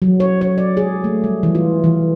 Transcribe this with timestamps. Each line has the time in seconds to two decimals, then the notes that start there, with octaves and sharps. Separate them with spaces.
0.02 F#3
0.20 C#5
0.41 C#5
0.58 D5
0.77 G#4
1.04 A3
1.24 G3
1.43 E3
1.55 F4
1.84 E3